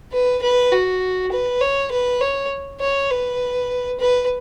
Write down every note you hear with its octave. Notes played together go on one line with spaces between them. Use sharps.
B4
B4
F#4
B4
C#5
B4
C#5
C#5
B4
B4